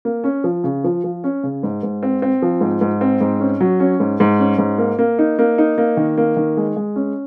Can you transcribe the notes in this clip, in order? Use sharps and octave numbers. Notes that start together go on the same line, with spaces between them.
A#3
C#4
F3
C#3
F3
F3
C#4
C#3
G#2
G#2
C4
C4
F3
G#2
G#2
C4
G#2
C#4
F#3
C#4
G#2
G#2
C#4
G#2
A#3
A#3
D#4
A#3
D#4
A#3
D#3
A#3
D#3
G#3
G#3
C#4